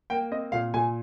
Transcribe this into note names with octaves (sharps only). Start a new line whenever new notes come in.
A#3 G5
C4 D#5
A#2 F5
A#2 G#5